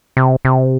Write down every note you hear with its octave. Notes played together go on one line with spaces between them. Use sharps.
C3
C3